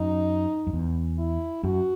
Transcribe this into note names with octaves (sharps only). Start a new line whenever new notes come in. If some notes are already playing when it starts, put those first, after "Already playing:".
Already playing: F#2 D#4
F#2
E2
E4
F#2 F#4